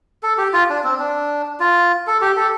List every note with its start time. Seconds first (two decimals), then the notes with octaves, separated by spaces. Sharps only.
0.23 A4
0.38 G4
0.53 F4
0.69 D4
0.84 C4
0.99 D4
1.60 F4
2.07 A4
2.21 G4
2.37 A4